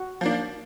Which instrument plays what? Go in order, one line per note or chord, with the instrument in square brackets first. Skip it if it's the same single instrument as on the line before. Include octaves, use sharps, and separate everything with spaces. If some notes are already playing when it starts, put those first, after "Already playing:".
Already playing: [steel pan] F#4
[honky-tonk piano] F3 A#3 D4